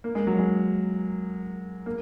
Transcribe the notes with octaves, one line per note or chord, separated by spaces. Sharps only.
A#3
G#3
F#3
G#3
A#3